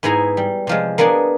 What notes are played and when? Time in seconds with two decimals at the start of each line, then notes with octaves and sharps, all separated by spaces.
0.03 G#2 B3 E4 G#4 A#5
0.37 G3
0.67 C3 F3 G#3
0.98 A#3 B3 D4 G#4 D5